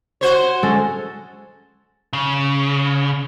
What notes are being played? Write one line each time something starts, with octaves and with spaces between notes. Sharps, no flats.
F#4 C5 C#5
G#3 C#4 A4
C#3